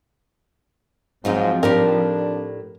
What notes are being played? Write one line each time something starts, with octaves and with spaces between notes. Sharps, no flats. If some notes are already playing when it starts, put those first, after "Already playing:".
G#2 F3 F#3 C4 D#4 F4
A2 D4 D#4 G4 A#4